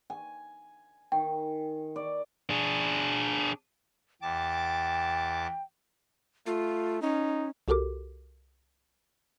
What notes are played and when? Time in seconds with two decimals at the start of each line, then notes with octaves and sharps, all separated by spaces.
0.10 G#5
1.12 D#3 G5
1.96 D5
2.50 D4 G#4
4.22 E2 G5 A5 D6
6.46 A3 F4
7.02 C#4 D#4
7.68 C2 F#4 G4 A4 A#4 D6